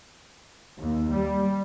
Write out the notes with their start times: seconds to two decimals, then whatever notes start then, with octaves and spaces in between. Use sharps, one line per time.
0.78 D#2
1.11 G3